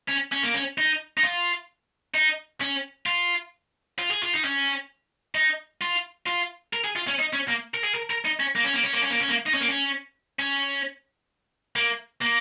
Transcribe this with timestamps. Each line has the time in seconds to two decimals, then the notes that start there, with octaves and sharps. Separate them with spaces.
0.09 C#4
0.32 C#4
0.43 A#3
0.54 C#4
0.78 D#4
1.17 D#4
1.23 F4
2.14 D#4
2.61 C#4
3.06 F4
3.98 F4
4.11 G#4
4.23 F4
4.33 D#4
4.44 C#4
5.35 D#4
5.81 F4
6.26 F4
6.73 A#4
6.84 G#4
6.96 F4
7.07 C#4
7.19 D#4
7.33 C#4
7.48 A#3
7.74 A#4
7.84 G#4
7.94 A#4
8.10 A#4
8.25 D#4
8.40 C#4
8.56 A#3
8.64 C#4
8.74 A#3
8.83 C#4
8.93 A#3
9.02 C#4
9.11 A#3
9.21 C#4
9.29 A#3
9.46 D#4
9.54 C#4
9.61 A#3
9.69 C#4
10.39 C#4
11.76 A#3
12.22 A#3